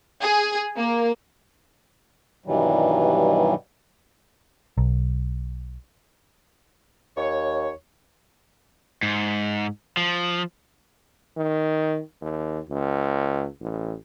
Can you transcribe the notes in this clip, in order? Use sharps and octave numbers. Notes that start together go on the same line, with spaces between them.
G#4
A#3
G2 B2 D#3 E3 F#3 G3
B1
D#2 C#5
G#2
F3
D#3
D#2
C#2
A1